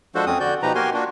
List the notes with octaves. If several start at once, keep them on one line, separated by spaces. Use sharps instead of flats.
F3 G#3 D4 F#4 A4 C5
F2 C4 C#4 D#6
D3 F#4 D5 G6
B2 F3 D#4 G4 B4 A#5
A#3 F#4 G4 A#4 G#5 C6
A#3 D4 F4 F#4